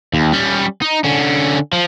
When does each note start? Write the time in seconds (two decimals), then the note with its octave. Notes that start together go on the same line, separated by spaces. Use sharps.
0.14 D#2
0.33 G3 C#4
0.82 D#4
1.04 D3 C#4
1.73 F3